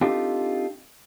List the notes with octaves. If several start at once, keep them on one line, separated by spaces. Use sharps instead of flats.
C4 D4 D#4 F4 G4 A4